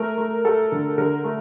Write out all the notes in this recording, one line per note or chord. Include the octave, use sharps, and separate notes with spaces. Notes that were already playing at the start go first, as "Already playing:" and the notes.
Already playing: A3 A#4
A3
A3 A4
D3
D3 A#4
A3